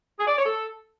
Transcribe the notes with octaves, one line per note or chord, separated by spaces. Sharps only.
G#4
D5
C#5
A4